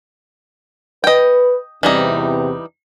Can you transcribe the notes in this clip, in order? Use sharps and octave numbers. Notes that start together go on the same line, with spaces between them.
B4 D#5 G5
E2 C3 E3 G3 D#4